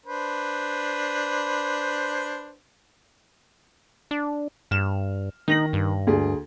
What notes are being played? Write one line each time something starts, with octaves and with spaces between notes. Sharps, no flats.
D4 B4 C5
D4
G2 F6 E7
D#3 D#4 A#6 F#7
G2
D2 G#4